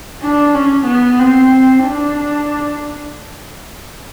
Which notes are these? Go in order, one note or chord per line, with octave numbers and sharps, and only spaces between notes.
D4
C#4
B3
C4
D4